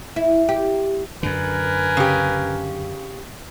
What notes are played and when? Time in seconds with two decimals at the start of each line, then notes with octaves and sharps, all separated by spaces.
0.16 E4
0.49 G4
1.23 F#2 D3 A#4 B4 G#5
1.97 C#3 G4